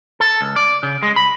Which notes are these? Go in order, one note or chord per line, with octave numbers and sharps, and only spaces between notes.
A4
C#2
D5
C#3
G#3
B5